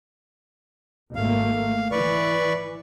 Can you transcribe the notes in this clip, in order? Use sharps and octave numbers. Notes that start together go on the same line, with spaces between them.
G#1 A3 A#3 F5
E3 B4 D5 C#6